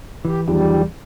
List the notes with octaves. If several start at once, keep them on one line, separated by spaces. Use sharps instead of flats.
E3 G4
E2 D#3 F3 G3 G4